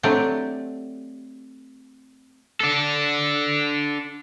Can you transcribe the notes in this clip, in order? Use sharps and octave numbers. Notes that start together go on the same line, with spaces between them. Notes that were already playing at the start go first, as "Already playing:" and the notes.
F#3 A3 C4 D4 G4
D4 A4